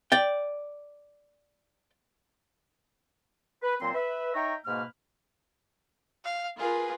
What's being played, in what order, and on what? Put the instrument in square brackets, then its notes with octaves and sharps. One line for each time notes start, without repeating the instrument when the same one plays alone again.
[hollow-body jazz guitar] D5 G5
[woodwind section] B4
A#2 F#3 C4 C5 C6
B4 E5
D#4 C#5 E5 G5 A#5 C#6
G#2 B2 A#3 B4 F6
[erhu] F5
[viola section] F4 A#4 B4 [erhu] G#4